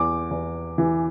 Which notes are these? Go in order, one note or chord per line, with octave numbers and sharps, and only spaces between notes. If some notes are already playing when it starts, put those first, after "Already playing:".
Already playing: E2 D6
E2
E3